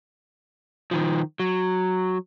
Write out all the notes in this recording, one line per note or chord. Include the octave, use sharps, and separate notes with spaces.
D#3 F3
F#3